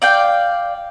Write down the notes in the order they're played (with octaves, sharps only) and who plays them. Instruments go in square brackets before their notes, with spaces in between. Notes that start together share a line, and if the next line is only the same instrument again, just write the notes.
[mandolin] D5 F5 G5